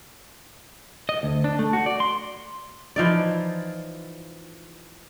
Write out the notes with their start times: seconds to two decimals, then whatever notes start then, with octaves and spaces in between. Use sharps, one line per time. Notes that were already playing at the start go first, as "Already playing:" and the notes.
1.09 D#5
1.23 D2
1.44 D4
1.59 A3
1.73 F#4
1.86 D5
2.00 C6
2.96 E3 F3 D#4 D5